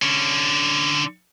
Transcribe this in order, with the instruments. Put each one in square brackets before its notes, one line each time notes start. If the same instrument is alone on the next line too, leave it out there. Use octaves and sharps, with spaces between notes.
[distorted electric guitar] D3 C#4